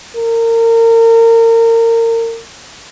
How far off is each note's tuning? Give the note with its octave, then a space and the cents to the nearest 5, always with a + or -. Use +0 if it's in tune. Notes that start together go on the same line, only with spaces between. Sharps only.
A#4 -30